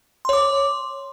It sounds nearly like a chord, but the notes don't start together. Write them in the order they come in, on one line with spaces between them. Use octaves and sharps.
C6 C#5 D6